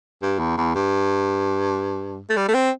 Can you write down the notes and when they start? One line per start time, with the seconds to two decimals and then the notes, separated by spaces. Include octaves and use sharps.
0.22 G2
0.39 E2
0.58 E2
0.75 G2
2.30 A3
2.37 G3
2.49 A3
2.54 C4